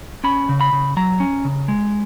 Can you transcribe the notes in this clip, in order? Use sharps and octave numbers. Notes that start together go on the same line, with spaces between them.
C#4 B5
C#3
B5
C#3
F#3 A#5
C#4
C#3
G#3